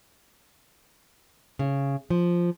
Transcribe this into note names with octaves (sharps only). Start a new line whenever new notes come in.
C#3
F3